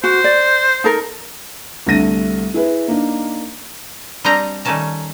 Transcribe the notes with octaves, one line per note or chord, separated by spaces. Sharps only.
F#4 C5
D5
D#4 A4 A#4
C2 D3 A3 A#6 D#7
E4 G#4 B4
A#3 D4 D#4
G3 C4 D4 D#5 G5 A#5
D#3 G3 A3 C#4 A5 A#5